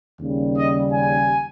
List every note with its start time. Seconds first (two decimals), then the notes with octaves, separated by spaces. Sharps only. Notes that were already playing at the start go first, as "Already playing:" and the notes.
0.20 D#2 C#3 G3
0.57 D#5
0.94 G#5